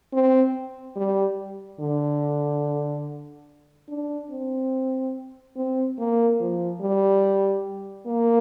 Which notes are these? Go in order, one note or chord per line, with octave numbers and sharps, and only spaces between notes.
C4
G3
D3
D4
C4
C4
A#3
F3
G3
A#3